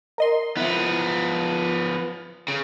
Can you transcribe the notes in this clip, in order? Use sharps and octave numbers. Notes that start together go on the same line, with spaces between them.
A#4 D#5 C6
F3 B3 E4
C#3